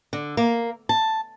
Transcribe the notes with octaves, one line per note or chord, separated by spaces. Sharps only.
D3
A#3
A5